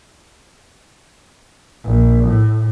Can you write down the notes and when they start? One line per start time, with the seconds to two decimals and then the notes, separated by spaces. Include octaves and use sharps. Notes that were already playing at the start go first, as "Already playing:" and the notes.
1.84 A#1
2.28 A2